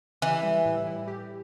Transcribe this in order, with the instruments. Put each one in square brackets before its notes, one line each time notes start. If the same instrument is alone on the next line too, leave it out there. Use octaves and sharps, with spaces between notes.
[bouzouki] E3 [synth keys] G4
[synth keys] G3
A2
E4
G4